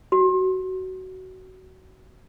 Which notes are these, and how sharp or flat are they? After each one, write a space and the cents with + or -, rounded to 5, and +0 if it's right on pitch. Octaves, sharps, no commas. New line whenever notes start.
F#4 +20